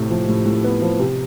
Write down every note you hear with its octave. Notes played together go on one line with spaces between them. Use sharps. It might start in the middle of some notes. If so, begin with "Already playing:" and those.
Already playing: A2 C3
F3
A2
A2
B3
F3
C3